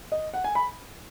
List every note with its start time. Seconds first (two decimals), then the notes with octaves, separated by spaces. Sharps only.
0.12 D#5
0.34 F#5
0.44 G#5
0.55 B5